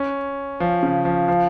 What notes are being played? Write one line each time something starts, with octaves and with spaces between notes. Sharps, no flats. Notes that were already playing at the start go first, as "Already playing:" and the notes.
Already playing: C#4
F3
C#3
F3
F3